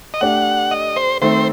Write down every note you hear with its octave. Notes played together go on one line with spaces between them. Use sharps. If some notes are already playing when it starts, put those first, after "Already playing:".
D#5
A3 D4 G4 F#5
D#5
C5
D#3 A3 C4 C5